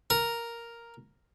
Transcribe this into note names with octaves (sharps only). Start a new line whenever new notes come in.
A#4